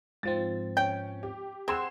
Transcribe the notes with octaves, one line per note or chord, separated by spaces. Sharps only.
G#2 F3 C4 A6
C#4 G5
G4
C4 G#4 F#5 C6 E6 G#6 E7